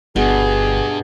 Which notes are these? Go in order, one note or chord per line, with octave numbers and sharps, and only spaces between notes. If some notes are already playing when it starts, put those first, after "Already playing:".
G1 G2 B2 G#4